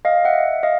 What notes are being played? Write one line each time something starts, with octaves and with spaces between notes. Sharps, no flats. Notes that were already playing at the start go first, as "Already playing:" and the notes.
D#5 F5
E5 F#5
D#5 F5